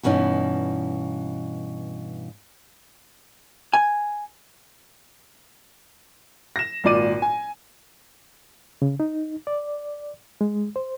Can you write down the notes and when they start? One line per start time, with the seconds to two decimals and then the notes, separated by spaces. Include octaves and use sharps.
0.03 G2 B2 E3 C#4 D#4
3.73 G#5
6.56 A#6 E7
6.84 G#1 A#2 F4 D5 D6 D#7
7.22 G#5
8.82 C#3
9.00 D#4
9.47 D5
10.41 G#3
10.76 C5